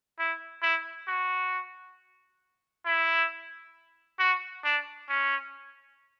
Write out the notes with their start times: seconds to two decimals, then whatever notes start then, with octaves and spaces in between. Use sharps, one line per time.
0.19 E4
0.62 E4
1.07 F#4
2.86 E4
4.19 F#4
4.64 D4
5.09 C#4